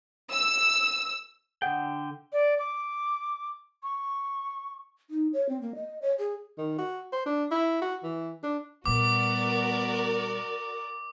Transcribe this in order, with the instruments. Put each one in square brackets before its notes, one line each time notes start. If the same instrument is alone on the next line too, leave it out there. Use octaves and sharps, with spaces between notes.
[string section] E6
[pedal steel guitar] D3 G5 [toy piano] A4 F#5
[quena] D5
D6
C#6
[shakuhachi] D#4
C#5
C4
A#3
D#5
C#5
G#4
[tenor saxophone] D#3
F#4
C5
D4
E4
F#4
E3
D4
[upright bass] A#2 G3 [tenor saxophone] B3 [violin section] F#4 A#4 D5 [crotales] D6